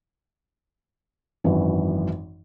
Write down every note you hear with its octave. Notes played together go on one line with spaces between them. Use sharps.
G#1 F#2 E3